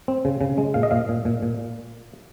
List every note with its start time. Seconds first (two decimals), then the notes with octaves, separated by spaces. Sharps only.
0.08 C4
0.25 C#3
0.41 C#3
0.58 G#3
0.74 A#2 F5
0.83 D#5
0.91 A#2 F5
1.09 A#2
1.25 A#2
1.43 A#2